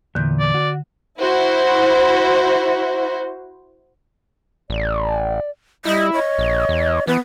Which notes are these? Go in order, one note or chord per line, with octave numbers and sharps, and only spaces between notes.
E2 A#2 D3 G6
D5
F#4
E4 F#4 C5
A1 D5
G3 E4 D#5
C#5 D#5
A#1
E2
E3 B3 B4